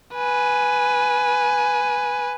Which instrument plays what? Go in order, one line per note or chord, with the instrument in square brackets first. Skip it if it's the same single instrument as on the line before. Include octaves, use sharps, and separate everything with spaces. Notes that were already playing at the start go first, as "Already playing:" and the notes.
[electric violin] B4 G#5